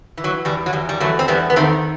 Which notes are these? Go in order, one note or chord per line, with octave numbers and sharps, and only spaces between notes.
E3
F#3
E2 G3
F#3
E2 G3
G3
E2 F#3 A3
C4
E2 G3 B3
B3
D#3 A3 C4